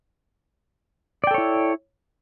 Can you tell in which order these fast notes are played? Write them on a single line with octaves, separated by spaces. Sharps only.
D5 G5 A4 C#5 E4